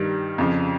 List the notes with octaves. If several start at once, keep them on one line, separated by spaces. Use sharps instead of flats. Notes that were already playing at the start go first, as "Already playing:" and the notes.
Already playing: G2 D#3 G3
F2 C#3 F3